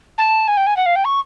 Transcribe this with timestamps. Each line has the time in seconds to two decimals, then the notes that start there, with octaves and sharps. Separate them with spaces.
0.18 A5
0.48 G#5
0.57 G5
0.66 G#5
0.76 F#5
0.86 F5
0.95 G5
1.04 C#6